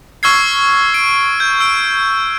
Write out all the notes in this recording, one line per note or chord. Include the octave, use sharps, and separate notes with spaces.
C#6 E6 F6 G#6 C7
D7
G6
E6 D7